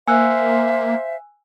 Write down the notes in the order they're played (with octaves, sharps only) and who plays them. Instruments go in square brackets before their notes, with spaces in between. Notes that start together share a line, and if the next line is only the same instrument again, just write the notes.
[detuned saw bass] A#3 [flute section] C5 E5 F5 [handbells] G#5 E6 F#6